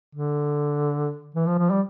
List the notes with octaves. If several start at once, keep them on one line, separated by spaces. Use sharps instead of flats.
D3
E3
F3
F3
G3